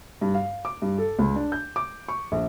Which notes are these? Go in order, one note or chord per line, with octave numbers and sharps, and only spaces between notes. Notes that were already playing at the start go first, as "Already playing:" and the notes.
G2
F5
D6
G2
A4
C#2
D4
G6
D6
C#6
A#1